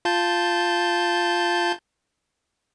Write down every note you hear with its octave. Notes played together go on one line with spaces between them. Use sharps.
F4 A5 G6